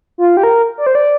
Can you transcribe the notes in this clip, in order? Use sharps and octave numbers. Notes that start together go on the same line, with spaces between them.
F4
G4
A#4
D5
C5
D5